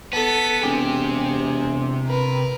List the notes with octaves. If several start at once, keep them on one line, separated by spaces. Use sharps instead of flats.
B3 A4 B6
E1 C3 G4 G#4
A#4 B4